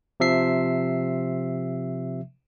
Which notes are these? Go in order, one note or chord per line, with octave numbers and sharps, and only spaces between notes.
C3 F3 E5 C7